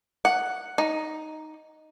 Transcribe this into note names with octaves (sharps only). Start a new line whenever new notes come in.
F#5
D#4